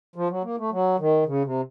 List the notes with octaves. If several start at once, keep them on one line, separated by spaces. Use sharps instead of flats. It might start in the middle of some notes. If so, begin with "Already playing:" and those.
F3
F#3
A#3
A3
F#3
D#3
C#3
C3